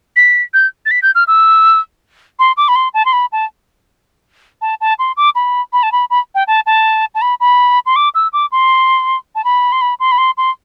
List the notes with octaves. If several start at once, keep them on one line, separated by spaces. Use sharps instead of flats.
B6
G6
A6
B6
G6
F6
E6
C6
D6
B5
C6
A5
C6
B5
A5
A5
A5
C6
D6
B5
B5
A5
B5
B5
G5
A5
A5
A5
B5
B5
C6
D6
E6
D6
C6
A5
B5
C6
B5
C6
B5
C6
C6